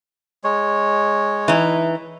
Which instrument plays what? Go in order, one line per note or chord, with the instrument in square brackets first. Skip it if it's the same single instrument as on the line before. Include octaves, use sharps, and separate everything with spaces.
[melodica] G#3 C#5
[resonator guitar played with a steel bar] E3 D#4